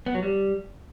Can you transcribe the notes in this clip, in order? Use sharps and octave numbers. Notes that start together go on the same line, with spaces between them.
B3
F#3
G3